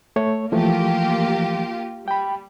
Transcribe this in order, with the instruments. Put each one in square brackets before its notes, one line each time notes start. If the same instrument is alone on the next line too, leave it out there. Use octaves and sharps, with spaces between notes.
[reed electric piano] A3 C#5
[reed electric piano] E3 F3 A3 [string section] A#3 F4 G4
[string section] G3 [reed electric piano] G5 B5